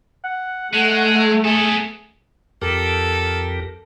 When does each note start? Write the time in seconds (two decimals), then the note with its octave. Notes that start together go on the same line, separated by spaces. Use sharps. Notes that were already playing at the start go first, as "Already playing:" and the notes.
0.24 F#5
0.74 G#3 A3
1.45 B3 G#4 A4
2.62 F2 G4 A4 A#4